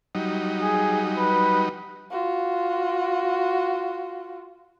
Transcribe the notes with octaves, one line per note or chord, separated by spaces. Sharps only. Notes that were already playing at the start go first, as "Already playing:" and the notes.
F#3 G3 D#4
G#4
B4
F4 F#4